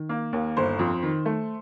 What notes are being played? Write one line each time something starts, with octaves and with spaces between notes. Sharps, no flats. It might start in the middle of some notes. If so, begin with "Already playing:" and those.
Already playing: D#3
A#3
D#2
G1 C5
F2
D#3
A3